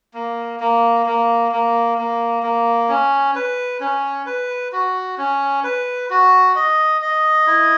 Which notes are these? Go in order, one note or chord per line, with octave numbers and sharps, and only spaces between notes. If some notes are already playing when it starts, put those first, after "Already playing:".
A#3
A#3
A#3
A#3
A#3
A#3
C#4
B4
C#4
B4
F#4
C#4
B4
F#4
D#5
D#5
E4